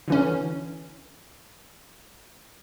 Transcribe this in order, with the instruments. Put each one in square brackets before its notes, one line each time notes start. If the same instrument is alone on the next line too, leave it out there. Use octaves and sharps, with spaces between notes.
[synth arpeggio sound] D3 E3 C#4